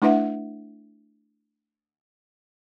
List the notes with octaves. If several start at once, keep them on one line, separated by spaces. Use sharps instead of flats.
A3 D4 E4 B4 E5 F#5